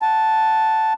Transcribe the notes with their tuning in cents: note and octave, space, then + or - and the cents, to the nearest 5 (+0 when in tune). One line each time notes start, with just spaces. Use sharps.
F#5 +0 A5 +0